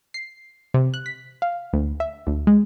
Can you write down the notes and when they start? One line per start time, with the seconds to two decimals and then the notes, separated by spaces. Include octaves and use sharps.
0.14 C7
0.74 C3
0.94 F#6
1.06 B6
1.42 F5
1.73 D2
2.00 E5
2.27 D2
2.47 G#3